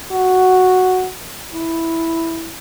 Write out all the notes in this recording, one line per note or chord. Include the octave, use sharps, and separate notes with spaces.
F#4
E4